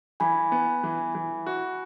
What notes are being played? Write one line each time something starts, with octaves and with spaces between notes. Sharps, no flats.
E3 G#5 B5
B3
E3
E3
F#4